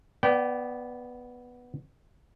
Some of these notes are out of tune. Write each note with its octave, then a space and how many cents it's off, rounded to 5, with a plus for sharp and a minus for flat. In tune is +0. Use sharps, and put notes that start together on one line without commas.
B3 -5 D5 +0 G5 -35